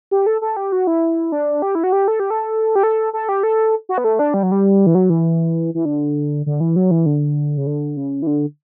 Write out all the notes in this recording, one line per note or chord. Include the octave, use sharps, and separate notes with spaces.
G4
A4
A4
G4
F#4
E4
D4
G4
E4
F#4
G4
A4
G4
A4
G4
A4
A4
G4
A4
F#4
B3
A3
D4
G3
F#3
G3
E3
F#3
E3
E3
D3
D3
E3
F#3
E3
D3
C#3
D3
C#3
E3
D3